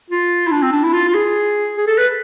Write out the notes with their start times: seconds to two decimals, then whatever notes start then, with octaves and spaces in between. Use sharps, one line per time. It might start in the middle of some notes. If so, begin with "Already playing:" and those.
0.10 F4
0.47 E4
0.51 D4
0.63 C4
0.72 D4
0.83 E4
0.93 F4
1.08 F4
1.15 G#4
1.77 G#4
1.87 A4
1.98 B4